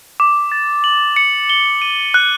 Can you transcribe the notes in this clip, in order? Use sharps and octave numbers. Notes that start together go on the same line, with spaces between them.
D6
A6
F#7
C#7
G7
D#7
F#6